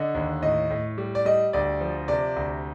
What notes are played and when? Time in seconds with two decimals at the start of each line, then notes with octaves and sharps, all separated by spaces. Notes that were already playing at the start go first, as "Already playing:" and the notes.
Already playing: D3 D#5
0.15 D#2
0.42 A2 D#5
0.70 A2
0.98 G3
1.15 D5
1.25 G3 D#5
1.53 D2 D5
1.81 F3
2.08 C3 D5
2.36 D2